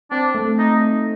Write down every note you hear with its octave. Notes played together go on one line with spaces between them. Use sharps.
C4 D4
A3
A3 D#4
D#4